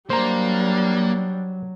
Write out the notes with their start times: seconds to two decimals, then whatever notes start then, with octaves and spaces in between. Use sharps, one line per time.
0.10 F#3 G3 A#3 D4 C5 A#5